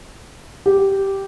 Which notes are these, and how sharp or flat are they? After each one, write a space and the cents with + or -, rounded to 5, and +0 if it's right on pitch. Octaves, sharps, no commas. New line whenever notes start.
G4 -5